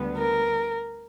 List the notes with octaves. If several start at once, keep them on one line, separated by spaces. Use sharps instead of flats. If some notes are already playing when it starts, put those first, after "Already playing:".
Already playing: D2 D3 G3 B3
A#4